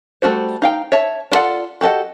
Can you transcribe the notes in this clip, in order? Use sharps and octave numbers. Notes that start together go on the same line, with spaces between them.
G3 A3 D4 F#4 C5
D#4 F5 G5
C#5 E5 A5
D4 F4 A4 D5 F#5
F#4 G4 A4 D#5 F#5